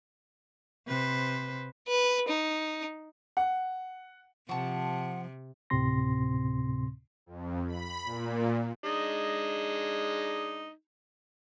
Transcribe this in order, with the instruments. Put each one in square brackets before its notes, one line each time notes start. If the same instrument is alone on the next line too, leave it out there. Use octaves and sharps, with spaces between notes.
[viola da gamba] C3 B4 C5
[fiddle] B4
D#4
[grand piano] F#5
[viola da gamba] C3 [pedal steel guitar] F3 [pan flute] F#5 [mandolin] A5 C#6
[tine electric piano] D2 A2 C3 C4 C6 A#6
[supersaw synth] F2
B5
A#2
[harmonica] G#3 D4 D#4